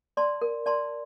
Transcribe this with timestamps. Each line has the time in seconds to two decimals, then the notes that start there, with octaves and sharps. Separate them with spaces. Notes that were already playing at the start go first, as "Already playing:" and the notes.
0.17 D5 A5 C6
0.42 A#4
0.66 D5 A5 C6